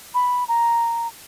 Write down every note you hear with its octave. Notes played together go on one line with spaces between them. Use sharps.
B5
A#5